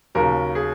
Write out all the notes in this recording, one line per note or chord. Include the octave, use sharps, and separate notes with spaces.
D#2 C#3 F#3 A#4
G#4